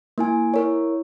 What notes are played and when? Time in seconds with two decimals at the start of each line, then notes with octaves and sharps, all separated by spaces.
0.18 A#3 E4 G#5
0.54 E4 A#4 C#5